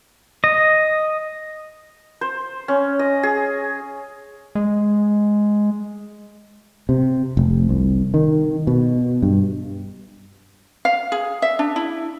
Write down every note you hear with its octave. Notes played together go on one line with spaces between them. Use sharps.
D#5
C5
C#4
D#5
G#4
G#3
C3
F1
C2
D#3
B2
G2
F5
G#4
E5
D4
E4